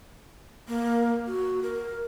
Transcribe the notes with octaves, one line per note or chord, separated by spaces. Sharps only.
A#3
F#4
A#4